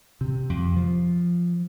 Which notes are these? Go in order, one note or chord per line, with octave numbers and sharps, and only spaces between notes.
C3
F2
F3